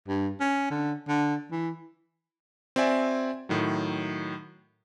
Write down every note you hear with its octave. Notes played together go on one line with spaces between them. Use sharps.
G2
C#4
D3
D3
E3
C4 F#4 D5 E5 G#5
A2 D#3 F#3